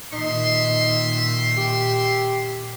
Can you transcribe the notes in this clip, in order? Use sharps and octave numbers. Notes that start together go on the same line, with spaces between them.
A#2 D#3 D#4 E5 C6
G4